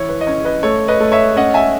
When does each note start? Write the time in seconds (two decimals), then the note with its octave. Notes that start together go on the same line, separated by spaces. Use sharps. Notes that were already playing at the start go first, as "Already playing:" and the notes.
Already playing: E3 E4 C#5
0.09 B4
0.21 D#5
0.27 C#4 C#5
0.45 B4 D#5
0.63 A3 C#5
0.88 B4 D#5
1.00 A3
1.12 C#5 E5
1.36 C#4 D#5 F#5
1.54 E5 G#5